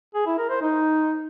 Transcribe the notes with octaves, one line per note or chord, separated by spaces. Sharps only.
G#4
E4
A#4
C5
D#4